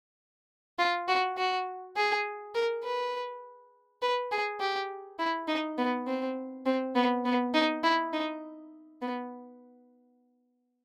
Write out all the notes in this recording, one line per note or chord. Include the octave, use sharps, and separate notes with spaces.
F4
F#4
F#4
G#4
A#4
B4
B4
G#4
G4
E4
D#4
B3
C4
C4
B3
B3
D#4
E4
D#4
B3